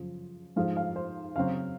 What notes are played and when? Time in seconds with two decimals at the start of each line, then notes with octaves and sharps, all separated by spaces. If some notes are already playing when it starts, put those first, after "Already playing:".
Already playing: F#2 C#3 F3
0.56 G#2 F3 G#3 F5
0.76 F5
0.96 C5
1.35 C#3 F#3 C4 F5